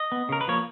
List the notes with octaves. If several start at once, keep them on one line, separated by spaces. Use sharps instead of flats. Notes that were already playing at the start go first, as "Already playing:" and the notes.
Already playing: D#5
B3
C#3 A#4
B4
F3 A#3 C#5